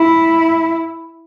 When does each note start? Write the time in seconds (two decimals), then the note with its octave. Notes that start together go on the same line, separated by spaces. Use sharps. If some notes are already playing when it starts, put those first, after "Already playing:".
Already playing: E4